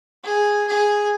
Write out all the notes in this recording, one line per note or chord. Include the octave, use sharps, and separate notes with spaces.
G#4
G#4